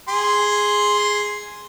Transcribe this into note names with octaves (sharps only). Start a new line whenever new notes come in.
G#4 C6